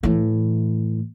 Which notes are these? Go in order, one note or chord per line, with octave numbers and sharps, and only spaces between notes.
A2 E3